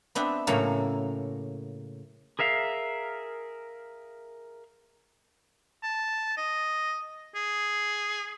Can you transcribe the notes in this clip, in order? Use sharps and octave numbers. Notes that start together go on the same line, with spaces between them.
B3 C4 D4 E5
A2 C#3 F#3 A#3 A4
G#4 A#4 E5 F5
A5
D#5
G#4